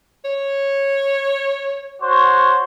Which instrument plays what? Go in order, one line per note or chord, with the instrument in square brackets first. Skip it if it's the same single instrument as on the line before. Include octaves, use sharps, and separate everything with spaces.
[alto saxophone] C#5
[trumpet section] F#4 C5 C#5